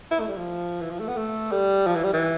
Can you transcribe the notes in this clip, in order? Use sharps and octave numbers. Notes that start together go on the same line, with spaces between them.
E4
A3
G3
F3
E3
F3
A3
B3
A3
G3
F3
E3
G3
E3